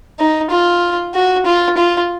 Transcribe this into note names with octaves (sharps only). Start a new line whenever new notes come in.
D#4
F4
F#4
F4
F4